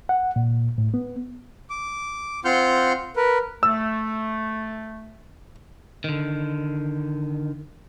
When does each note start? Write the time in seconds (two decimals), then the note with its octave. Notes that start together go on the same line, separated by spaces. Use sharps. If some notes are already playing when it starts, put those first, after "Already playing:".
0.09 F#5
0.36 A#2
0.78 A2
0.94 B3
1.70 D6
2.45 C4 F4 F#5 C6 F6 G6
3.16 A#4 B4
3.63 A3 E6
6.04 D3 D#3